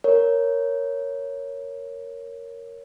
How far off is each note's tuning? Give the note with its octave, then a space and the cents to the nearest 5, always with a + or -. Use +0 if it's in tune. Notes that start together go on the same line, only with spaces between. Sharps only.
A#4 +0 C#5 +0